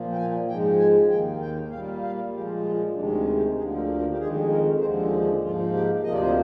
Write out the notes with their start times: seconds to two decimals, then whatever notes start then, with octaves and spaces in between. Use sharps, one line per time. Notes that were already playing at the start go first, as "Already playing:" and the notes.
Already playing: A#2 F3 A#3
0.12 G5
0.17 G#5
0.48 G#2 F3 G#3 G5
0.78 G#5
1.10 D#2 D#3 A#3 G5
1.41 G5
1.71 A#2 G3 A#3 F5
2.02 F5
2.33 A#2 F3 G#3 G4
2.64 F4
2.95 D2 C3 D#3 G#3 D4
3.36 G4
3.57 D2 D3 F3 A#3 G#4
3.77 A#4
3.98 A#4
4.11 G4
4.19 F2 D#3 G#3 G#4
4.50 A#4
4.80 D#2 D3 F3 G#3 C5
5.00 D#4
5.21 D4
5.42 G#2 F3 A#3 F4
5.73 G4
6.03 D2 C3 F3 A#3 D#5
6.13 D5
6.22 C5